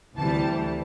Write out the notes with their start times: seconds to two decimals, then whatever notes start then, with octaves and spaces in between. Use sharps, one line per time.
0.17 D2 C3 E3 G3 A5